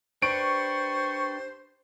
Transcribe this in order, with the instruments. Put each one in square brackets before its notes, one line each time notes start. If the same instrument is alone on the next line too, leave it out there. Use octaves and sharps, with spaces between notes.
[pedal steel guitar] D4 G4 B4 [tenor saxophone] C5 [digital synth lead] C#6 [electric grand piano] D7